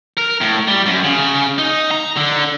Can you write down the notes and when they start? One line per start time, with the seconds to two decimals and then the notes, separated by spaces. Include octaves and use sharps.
0.17 A#4
0.41 A2
0.68 G3
0.86 F#2
1.04 C#3
1.58 D#4
1.91 A#5
2.17 D3